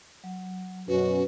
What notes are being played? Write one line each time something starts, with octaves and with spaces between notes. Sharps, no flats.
F#3
F#2 B2 C#4 F#4 B4